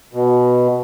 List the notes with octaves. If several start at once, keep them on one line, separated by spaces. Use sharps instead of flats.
B2